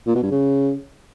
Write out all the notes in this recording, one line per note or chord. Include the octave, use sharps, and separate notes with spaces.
A#2
B2
G2
C#3